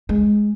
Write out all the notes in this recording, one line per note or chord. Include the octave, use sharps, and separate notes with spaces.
G#3